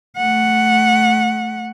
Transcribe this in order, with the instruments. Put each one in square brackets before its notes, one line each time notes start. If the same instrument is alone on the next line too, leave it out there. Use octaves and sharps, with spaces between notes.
[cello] A3 F#5